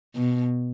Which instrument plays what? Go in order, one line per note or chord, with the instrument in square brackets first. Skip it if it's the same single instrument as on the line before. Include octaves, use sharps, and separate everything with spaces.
[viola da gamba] B2